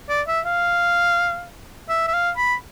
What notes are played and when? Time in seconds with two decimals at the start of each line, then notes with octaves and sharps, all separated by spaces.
0.09 D5
0.28 E5
0.45 F5
1.89 E5
2.07 E5
2.13 F5
2.37 B5